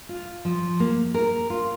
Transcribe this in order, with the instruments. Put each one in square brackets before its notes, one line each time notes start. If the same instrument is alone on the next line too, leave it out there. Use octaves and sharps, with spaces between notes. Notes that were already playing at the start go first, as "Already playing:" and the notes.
[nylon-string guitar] F4
F3
A#3
A#4
F4